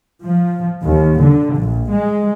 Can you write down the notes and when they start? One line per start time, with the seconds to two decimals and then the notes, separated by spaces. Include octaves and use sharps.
0.22 F3
0.82 D#2
1.22 D3
1.58 A#1
1.93 G#3